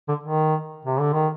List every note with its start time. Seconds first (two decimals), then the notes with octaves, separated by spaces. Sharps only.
0.08 D3
0.23 D#3
0.85 C3
0.99 D3
1.13 D#3